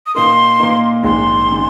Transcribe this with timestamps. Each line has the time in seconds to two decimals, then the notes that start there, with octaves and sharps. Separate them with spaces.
0.06 D#6
0.15 A#2 A#3 D#4 A#4 C6
0.60 A#2 A#3 D#4 A#4
1.03 A#1 G#2 D#3 G#3 C6
1.51 D#3 G#3